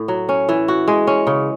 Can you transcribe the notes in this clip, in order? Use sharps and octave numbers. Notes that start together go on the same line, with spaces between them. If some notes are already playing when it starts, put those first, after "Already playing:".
Already playing: A2
F#3
C#4
E3
F#4
G#3
C#4
C#3